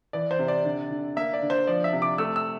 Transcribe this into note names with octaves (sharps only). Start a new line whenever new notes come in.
E3 D5
C5
C3
D5
D3
D3
A#3 E5
D5
D3
C5
F3 D5
E5
C3
D6
A3 E6
E6